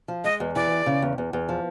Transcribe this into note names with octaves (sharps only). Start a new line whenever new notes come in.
F3
G#3 D#5
E2
E3 D5
E2
C#3
E2
E2
E2
F3